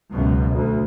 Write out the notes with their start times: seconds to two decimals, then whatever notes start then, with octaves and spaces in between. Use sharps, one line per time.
0.11 C#2 F#2 B2
0.52 D2